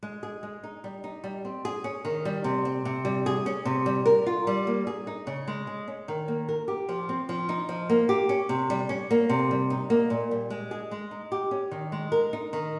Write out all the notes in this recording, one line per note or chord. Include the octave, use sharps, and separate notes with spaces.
G#3
G#4
G#3
D#4
G3
D#4
G3
C4
G#4
C#4
D#3
G3
C3
C4
C3
G3
G#4
C#4
C3
G3
A#4
F4
G3
A#3
G#4
D#4
C#3
G#3
G#4
C#4
D#3
A#3
A#4
G4
F3
C4
F3
D#4
F3
A#3
G4
C#4
C3
G3
C#4
A#3
C3
G3
D#4
A#3
A#2
G3
G#3
G#4
G#3
D#4
G4
C#4
D#3
G#3
A#4
D#4
D#3